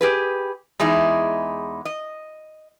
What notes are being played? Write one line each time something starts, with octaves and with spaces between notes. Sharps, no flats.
G4 G#4 B4
E2 G#3 D#4 E4
D#5